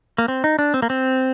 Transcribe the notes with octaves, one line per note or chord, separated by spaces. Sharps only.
A#3
C4
D#4
D4
C4
A#3
C4